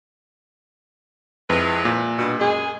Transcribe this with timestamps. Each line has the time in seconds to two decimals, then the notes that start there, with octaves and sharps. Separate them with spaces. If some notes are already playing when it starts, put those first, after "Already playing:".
1.50 F2 G#3 E4 B4
1.85 A#2
2.18 G2 B2
2.39 F#2 G#3 G#4